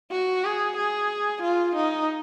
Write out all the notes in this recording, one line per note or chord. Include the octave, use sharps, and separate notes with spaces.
F#4
G#4
G#4
F4
D#4